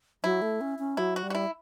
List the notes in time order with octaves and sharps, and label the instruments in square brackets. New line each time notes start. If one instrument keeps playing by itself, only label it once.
[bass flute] F#3 [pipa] E4
[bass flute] A3
C#4
C#4
[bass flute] F#3 [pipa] E4
[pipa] F#4
[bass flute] G3
[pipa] F#4
E4